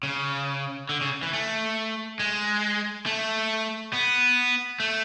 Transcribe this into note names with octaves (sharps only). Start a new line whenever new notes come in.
C#3
D3
C#3
E3
A3
G#3
A3
B3
A3